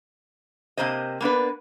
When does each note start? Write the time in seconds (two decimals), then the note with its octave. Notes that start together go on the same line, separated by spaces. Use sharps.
0.77 C3 A#3 C5 D#5
1.21 A#3 B3 D4 B4